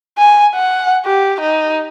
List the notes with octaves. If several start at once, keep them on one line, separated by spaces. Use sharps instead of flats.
G#5
F#5
G4
D#4